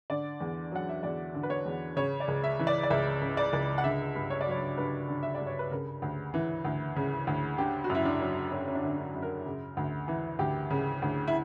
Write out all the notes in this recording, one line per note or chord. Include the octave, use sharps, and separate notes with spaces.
D3 D5
E2
F#3 F#5
E5
E2 D5
D3
B4
C#5
E2
C#3 C#5
D5
C#2
E5
E3
D5
D5
C#2 E5
C#3
D5
C#2
F#5
D3 E5
G2
C#5
D5
F#3 C#5
G2 B4
D3
E5
D5
G2
C#5
B4
C#3 A#4
D2
E3
D2
C#3
D2
D3 G4
F#4
F#2
E4
D4
F#3
F#2 C#4
C#4
D4
D3
C#4
D4
F#2
A#4
C#3
D2
E3
D2 G4
C#3
D2
E4